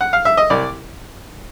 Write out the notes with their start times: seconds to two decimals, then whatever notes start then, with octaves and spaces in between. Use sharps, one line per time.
0.01 F#5
0.13 F5
0.25 E5
0.37 D#5
0.50 C2 D5